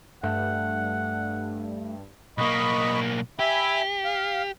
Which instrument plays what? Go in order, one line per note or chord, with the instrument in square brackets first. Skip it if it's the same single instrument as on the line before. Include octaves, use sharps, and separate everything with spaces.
[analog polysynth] G2 [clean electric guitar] A3 [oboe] F#5
[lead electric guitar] B1 A#3 [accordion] D#5 B5 C#6
[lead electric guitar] G4 [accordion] E5 G#5 B5
[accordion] F5